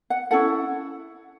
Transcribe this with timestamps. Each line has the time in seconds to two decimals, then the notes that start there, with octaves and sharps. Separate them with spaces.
0.10 F#5
0.31 C#4 E4 A4 F#5